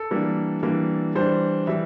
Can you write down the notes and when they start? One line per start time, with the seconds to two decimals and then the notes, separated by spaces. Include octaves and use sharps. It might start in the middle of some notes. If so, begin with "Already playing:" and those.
Already playing: A4
0.11 E3 G3 A#3 D4
0.63 E3 G3 A#3 D4
1.15 E3 G3 D4 C5
1.67 E3 G3 E5